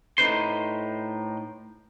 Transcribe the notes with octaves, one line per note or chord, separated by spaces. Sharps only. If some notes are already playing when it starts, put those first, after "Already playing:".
A2 D4 D#4 B4 C5 C6